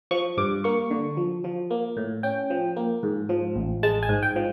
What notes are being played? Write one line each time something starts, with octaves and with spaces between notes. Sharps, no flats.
F3 C#6
G2 D6
A#3 C#6
D3
F3
F3
A#3
A2
C#4 G5
F3
A#3
G#2
F3
A1
G#3 A5
G#5
G#2
G5
F3